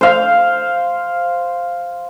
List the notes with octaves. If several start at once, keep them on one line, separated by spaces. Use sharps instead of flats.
C5 F5